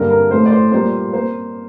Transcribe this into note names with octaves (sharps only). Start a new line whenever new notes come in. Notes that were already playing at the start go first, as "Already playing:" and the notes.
Already playing: G2 D3 G3 A#3 A#4
A#4
A2 A3 C5
D5
C5
A#2 G3 A#3 C5
A#3 C5